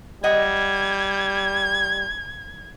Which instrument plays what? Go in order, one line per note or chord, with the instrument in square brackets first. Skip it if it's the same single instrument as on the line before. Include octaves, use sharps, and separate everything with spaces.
[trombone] G3 [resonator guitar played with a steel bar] D#5 F#5 [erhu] G#6